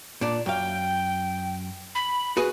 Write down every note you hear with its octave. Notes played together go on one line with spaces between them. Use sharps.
A#2 D4 D5
F#2 F5 G5
B5
F#4 G#4 B4